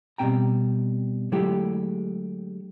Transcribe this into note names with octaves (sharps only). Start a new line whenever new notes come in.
B2 F#3 G3 C4 G5 A#5
D3 F#3 G#3 A3 E4 G4